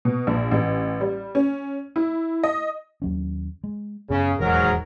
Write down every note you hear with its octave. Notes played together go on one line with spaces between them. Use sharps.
B2
A#1
A1
G3
C#4
E4
D#5
D#2 F#3 C#4
G#3
F#2 C#3 B3
D#1 E2 G#2 F#3 A#4